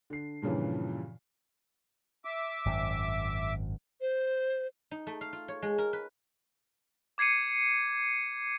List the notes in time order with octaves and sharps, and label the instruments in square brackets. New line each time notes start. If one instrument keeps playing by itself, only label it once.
[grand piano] D3 C7
G2 A#2 C#3 E3 F3
[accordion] E5 D6
[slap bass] G#1 F#2
[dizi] C5
[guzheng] D#4
A3
F5
F4
C#5
G#3
A#4
B4
[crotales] D6 G#6 C7 C#7 D#7